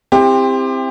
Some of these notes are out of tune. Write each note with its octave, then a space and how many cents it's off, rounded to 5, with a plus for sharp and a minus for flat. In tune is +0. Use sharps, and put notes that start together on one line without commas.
C4 +0 E4 +0 G4 +25